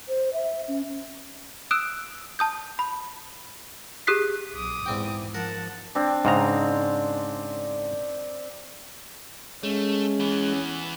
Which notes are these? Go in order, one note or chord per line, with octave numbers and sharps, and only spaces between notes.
C5
E5
C#4
D#6 E6 F#6 D7 E7
A5 D#6 G6
B5
G4 G#4 D#6 F#6 B6 C7
B1 D6 D#6
E2 G#2 C4 G5
F3 A#4 F#5 A5
C4 D4
G#2 C#3 A#5
G#3 A3 C#4
E3 B3